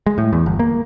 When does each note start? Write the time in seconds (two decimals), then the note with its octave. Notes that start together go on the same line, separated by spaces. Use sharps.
0.07 G#3
0.18 A2
0.33 E2
0.46 G1
0.59 A#3